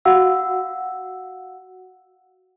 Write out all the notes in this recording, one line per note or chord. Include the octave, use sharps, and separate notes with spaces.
F#4 F5 F#5 E6